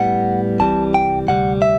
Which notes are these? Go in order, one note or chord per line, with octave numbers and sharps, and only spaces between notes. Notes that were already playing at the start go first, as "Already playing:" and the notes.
Already playing: A2 G3 B3 F#5
C2 C3 E3 G3 A5
G5
D2 C3 G3 F#5
E5